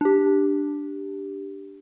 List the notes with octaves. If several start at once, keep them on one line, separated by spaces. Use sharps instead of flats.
D4 G4